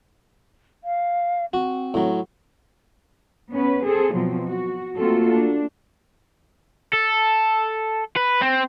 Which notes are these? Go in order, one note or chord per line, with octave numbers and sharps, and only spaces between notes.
F5
C4 F#4
A2 F#3
B3 C#4 B4
C4 G#4 A4
B2 F3 F#3 C4
F#4
A3 A#3 C4 F4 F#4 A4
D4
A4
B4
C4